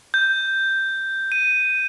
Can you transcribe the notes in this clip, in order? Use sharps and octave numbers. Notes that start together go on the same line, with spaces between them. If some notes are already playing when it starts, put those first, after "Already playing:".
G6
D#7